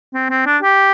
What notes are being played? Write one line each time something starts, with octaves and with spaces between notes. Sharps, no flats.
C4
C4
D4
G4